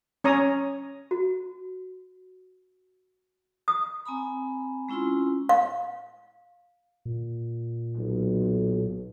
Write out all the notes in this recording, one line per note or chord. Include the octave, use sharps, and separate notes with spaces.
C#4 C#5 A#5 D#6
F#4
D#6
C4 G#5 A#5 B5
G#3 C#4 E4 F4 C6
F5
A#2
B1